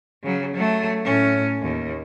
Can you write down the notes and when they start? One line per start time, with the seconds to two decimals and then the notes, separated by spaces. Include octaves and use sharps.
0.23 C#3 F#3
0.56 F#3 A3
1.04 A2 C#4
1.62 D#2